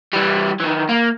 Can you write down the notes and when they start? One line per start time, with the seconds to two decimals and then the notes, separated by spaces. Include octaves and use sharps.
0.13 E3 G3
0.60 D#3 E3
0.89 A#3